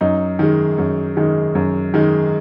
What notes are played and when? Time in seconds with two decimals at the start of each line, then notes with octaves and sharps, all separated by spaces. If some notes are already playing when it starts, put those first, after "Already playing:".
0.01 F#2 D#4
0.39 D#3 G#3
0.78 F#2
1.17 D#3 G#3
1.55 F#2
1.94 D#3 G#3